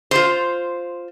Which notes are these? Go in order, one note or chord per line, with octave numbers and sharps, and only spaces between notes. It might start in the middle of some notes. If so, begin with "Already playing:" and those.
F4 C5